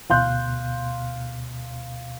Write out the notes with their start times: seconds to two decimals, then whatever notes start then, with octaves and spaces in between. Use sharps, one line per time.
0.10 D2 B2 F5 C6 F#6 G6